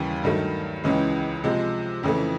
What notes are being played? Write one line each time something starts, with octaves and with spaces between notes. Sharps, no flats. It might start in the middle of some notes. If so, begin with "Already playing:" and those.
Already playing: D#2 C#3 E3 G3
G2 D#3 F#3 A3
C#2 C#3 E3 G#3
C3 F3 G#3
F2 C#3 E3 A3